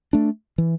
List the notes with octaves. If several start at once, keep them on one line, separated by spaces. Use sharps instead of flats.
A3 D4
E3